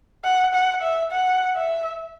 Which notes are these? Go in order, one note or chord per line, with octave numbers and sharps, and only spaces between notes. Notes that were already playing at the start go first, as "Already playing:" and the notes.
F#5
F#5
E5
F#5
E5